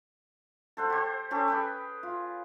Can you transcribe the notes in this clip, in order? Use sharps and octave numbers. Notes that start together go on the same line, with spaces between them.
A4 C5 F#5
G4 C5
C#4 G4 A4
G#4 B4 G5
F4